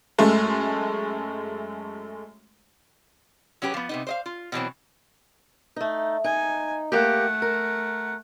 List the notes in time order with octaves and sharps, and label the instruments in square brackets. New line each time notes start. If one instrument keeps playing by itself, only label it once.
[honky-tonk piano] F#2 G#3 A3
[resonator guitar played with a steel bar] F#3 C#4 G4 G#4 B4
F3 B3
C3 B3 D#4
C5 D#5 F5
F4
B2 E3 F#3 C4
[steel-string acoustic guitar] A3 D#4
[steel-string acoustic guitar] D#4 [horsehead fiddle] G#5
[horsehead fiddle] A3 F#5 [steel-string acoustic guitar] A#3 G4
[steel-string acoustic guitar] A#4